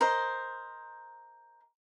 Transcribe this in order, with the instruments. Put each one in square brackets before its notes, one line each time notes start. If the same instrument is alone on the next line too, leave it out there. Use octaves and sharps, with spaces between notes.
[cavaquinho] A#4 C5 D#5